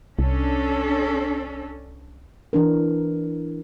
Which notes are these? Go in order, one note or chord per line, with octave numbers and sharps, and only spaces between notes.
C2 C#4 D4 A4
E3 D4 A#4